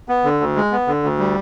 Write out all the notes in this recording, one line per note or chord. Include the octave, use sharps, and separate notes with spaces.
B3
D3
D2
G#3
B3
D3
D2
G3